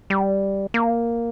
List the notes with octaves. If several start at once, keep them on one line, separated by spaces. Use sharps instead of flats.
G3
A#3